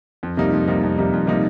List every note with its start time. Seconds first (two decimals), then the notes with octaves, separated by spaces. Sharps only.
0.23 F2
0.37 C3 G3 A#3 D#4
0.53 F2
0.68 C3 G3 A#3 D#4
0.83 F2
0.98 C3 G3 A#3 D#4
1.13 F2
1.27 C3 G3 A#3 D#4